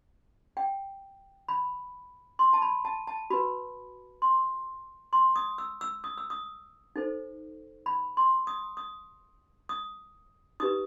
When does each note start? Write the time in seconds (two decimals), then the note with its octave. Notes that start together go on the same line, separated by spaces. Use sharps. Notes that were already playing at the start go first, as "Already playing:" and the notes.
0.57 G5
1.48 B5
2.39 C6
2.53 A5
2.62 B5
2.85 A5
3.07 A5
3.30 F#4 B4 B5
4.22 C6
5.13 C6
5.36 D#6
5.58 E6
5.81 E6
6.04 D#6
6.18 E6
6.30 D#6
6.96 D#4 A4 C5
7.86 B5
8.17 C6
8.47 D#6
8.77 D#6
9.69 D#6
10.60 D#4 G4 B4 D#6